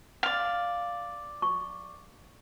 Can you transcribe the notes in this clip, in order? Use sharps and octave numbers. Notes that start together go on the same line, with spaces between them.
D5 F5
C#6